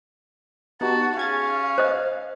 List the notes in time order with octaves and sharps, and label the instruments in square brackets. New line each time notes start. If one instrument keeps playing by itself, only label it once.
[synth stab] B3 D#4 G4 [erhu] F#4 [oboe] A5
[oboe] C#4 [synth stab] G#4 G#6 A6 [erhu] F5
[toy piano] C5 D#5